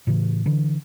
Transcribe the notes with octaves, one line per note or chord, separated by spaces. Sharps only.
A2 C#3 E3
D3 E3